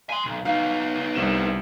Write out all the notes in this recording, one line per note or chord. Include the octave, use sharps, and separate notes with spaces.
G#5 C6
B1
B3 D#4 F5
C2 C4 E7